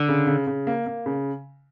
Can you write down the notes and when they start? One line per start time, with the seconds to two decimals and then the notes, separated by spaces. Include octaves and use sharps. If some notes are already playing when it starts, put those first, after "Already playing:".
Already playing: D3
0.08 C#3
0.27 C#3
0.47 C#3
0.67 A#3
0.86 A#3
1.06 C#3